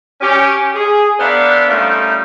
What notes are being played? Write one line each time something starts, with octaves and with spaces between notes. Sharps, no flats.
C#4 G4
G#4
B3 D4 A#4 C5 E5 F5
G3 A3 A#3 C#4 D#4 F4